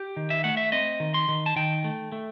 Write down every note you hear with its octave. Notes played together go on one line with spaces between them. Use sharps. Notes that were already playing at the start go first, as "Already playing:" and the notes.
Already playing: G4
D#3
E5
A3 F#5
E5
C4 D#5
D#3
C6
D#3
A5
D#3 G5
A3
A3